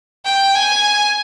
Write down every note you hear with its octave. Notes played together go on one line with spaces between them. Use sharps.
G5
G#5